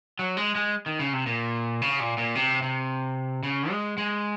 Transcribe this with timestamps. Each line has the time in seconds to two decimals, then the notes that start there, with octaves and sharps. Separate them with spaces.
0.19 F#3
0.37 G#3
0.55 G#3
0.86 D#3
1.00 C#3
1.13 C3
1.26 A#2
1.82 C#3
2.00 A#2
2.18 A#2
2.35 C3
2.62 C3
3.43 C#3
3.70 G#3
3.98 G#3